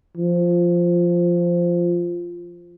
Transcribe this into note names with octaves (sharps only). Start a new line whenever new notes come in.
F3